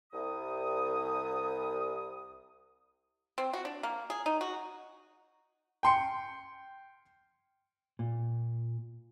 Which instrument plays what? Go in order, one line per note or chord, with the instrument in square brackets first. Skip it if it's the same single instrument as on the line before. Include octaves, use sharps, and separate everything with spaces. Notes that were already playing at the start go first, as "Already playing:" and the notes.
[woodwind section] C2 D#6
[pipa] C4
F#4
D4
A#3
G#4
D#4
F#4
[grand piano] G5 C6 C#7
[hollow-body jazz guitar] A#2